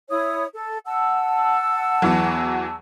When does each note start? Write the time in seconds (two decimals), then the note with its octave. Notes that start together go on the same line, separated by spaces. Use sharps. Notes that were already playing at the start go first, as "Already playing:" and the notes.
0.10 E4 C#5 D#6
0.54 A4
0.86 F#5 A5 E6
2.02 E2 E3 F#3